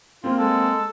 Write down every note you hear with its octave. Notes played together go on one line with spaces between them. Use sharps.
A#3 C4 F4
G#3 A4